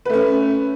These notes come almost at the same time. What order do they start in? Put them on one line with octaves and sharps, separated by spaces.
B4 A3 C#4